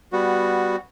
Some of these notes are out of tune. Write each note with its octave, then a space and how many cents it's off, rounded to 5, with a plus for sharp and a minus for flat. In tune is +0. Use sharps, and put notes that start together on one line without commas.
G3 +0 B3 +0 F#4 -5